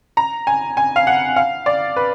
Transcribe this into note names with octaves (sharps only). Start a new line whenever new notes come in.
A#5
G#5
G#5
F5
F#5
F5
D5
B4